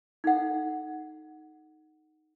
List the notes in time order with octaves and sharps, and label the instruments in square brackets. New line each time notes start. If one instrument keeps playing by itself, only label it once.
[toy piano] D#4 A4 F#5